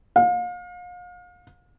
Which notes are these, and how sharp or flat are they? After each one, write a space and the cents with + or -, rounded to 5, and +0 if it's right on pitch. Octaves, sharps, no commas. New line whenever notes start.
F5 +35